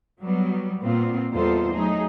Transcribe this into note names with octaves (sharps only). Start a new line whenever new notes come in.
F#3 G3 B3
A#2 B3 C4 F4
E2 G3 D#4 F4 A4 C5
F#3 A3 D#4 G#4